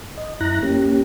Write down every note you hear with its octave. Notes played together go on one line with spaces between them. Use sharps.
D#5
F#2 E4 A#5 F#6 A#6
A#3 C#4 G4